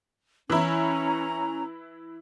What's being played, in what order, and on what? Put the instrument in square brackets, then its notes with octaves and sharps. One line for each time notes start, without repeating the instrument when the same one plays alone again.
[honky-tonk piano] E3 E4 [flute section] C#4 A#5